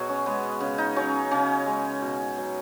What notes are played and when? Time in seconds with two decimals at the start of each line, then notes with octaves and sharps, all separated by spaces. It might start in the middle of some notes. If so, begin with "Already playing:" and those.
Already playing: B2 F#3 F#4 G#4 C#5
0.09 C#4
0.26 G#3 B3
0.60 C#3
0.78 D#4
0.96 F#3 C#4
1.31 C#3 C#4
1.66 G#3
2.02 B2
2.38 F#3